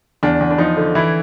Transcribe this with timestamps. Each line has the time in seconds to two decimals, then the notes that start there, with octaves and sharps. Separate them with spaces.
0.23 E2 D4
0.40 E2
0.51 D4
0.58 F3 D#4
0.77 D3
0.95 E3 E4